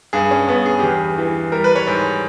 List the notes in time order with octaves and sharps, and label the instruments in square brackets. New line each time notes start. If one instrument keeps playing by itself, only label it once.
[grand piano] G2 G#4
C#4
G2 B3
G#4
E2 G4
G#4
E3
G3 A#4
B4
C#5
G#2